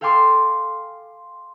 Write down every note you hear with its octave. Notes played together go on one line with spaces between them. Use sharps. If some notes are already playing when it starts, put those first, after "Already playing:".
A4 F5 G5 G#5 C6 D6